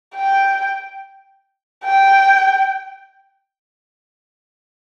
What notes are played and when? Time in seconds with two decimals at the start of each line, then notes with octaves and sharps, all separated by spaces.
0.16 G5
1.84 G5